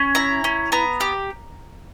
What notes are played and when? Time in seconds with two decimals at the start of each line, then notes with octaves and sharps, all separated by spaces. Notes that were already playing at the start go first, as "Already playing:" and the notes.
Already playing: C#4
0.15 E4 A#5
0.44 C#4
0.72 B3 A#5
1.01 G4